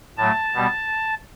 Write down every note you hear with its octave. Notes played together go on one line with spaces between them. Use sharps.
A2 F#3 A3 A5
B2 G3 B3